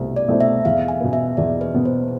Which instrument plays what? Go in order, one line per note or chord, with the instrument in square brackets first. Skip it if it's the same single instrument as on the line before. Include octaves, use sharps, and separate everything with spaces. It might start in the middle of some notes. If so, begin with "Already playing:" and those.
Already playing: [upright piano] C2 B2 A3 C4
[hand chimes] D5
[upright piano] B2 A3 C4 E4
[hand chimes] E5
[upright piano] E2 [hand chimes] F5
[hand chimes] G#5
[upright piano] B2 B3
[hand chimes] E5
[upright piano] E2 [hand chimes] D5
[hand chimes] B4
[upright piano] B2 B3
[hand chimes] C5